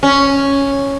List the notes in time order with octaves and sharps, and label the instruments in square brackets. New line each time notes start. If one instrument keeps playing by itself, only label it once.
[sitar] C#4